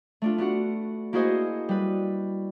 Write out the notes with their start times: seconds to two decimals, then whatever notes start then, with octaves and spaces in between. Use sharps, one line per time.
0.22 A3 D4 F4
0.38 B3 D4 F#4 F#5
1.13 A#3 E4 F#4 G#4 C5 D#5
1.69 G3 B4